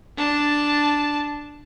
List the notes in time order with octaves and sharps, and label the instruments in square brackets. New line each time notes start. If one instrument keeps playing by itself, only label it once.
[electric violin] D4 A5